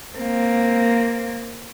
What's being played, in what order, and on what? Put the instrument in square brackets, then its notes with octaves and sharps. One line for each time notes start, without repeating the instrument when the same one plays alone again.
[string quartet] A#3 C4